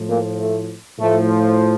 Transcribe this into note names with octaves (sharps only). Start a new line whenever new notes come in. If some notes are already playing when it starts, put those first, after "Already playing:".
Already playing: A2 F3
A#2 A#3
A3
A2 F3 A3